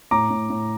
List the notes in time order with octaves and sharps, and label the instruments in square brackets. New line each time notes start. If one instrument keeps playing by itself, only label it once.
[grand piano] A2 A#5 D6
A2
A2